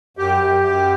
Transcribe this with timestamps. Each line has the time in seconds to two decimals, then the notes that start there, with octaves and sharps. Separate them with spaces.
0.17 F#2 G4
0.41 F#2
0.65 F#2